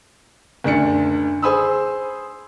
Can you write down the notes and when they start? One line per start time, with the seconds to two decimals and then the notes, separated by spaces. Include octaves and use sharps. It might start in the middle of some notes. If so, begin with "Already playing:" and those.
0.64 F#1 D2 D4 C#7
1.42 G#4 C5 G#5 B5 D#6 E6